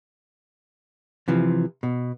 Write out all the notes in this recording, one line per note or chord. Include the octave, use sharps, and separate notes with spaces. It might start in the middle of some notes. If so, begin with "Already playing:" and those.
C3 E3 F3
B2